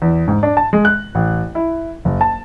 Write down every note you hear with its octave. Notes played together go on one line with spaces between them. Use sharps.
E2
G#2
D4
A5
G#3
F#6
A1
E4
F#1
A5